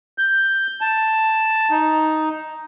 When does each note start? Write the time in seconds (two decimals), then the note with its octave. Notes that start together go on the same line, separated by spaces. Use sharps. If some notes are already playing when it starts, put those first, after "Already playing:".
0.18 G6
0.81 A5
1.71 D#4